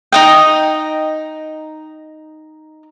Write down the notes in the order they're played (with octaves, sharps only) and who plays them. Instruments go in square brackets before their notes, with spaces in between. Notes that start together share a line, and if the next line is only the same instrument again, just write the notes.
[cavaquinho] D#4 D#5 G5